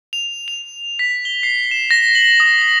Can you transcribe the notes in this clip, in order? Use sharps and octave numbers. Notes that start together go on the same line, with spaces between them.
F7
F7
B6
G7
C7
E7
A#6
F#7
D#6
F#7